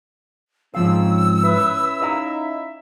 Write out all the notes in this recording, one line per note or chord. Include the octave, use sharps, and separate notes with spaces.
G#2 F3 C4 C#4 F5 E6
C#4 E4 B4 E5
D#4 D#5 F5 A#5